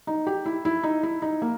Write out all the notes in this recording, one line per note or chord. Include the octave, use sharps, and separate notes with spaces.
D#4
G4
E4
E4
D#4
E4
D#4
A#3